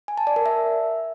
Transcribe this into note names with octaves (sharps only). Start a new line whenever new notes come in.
G#5
A5
D5
A#4
E5